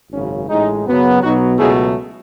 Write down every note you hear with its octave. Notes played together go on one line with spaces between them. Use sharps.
G#1 F#2 C#3 C#4
A1 A2 G#3 D#4
F#2 C#3 F#3 B3
B1 B2 F#3 B3 D#4 F#4
C#2 B2 F#3 A3 E4 G#4